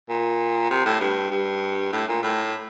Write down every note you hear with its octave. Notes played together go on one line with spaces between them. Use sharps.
A#2
C3
A2
G2
G2
A2
A#2
A2